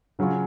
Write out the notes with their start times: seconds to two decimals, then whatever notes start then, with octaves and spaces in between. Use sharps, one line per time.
0.19 C#3 F#3 C#4 F4